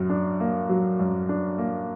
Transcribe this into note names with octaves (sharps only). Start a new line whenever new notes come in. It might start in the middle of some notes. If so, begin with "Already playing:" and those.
Already playing: F#2 F#3
D4
A#3
F#3
F#2
D4
A#3